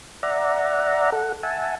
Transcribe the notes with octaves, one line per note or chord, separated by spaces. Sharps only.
D5 E5 F#5 A#5
A4 F#5
E5 F#5 G#5 A5